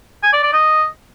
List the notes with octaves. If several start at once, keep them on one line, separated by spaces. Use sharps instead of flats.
G#5
D5
D5
D#5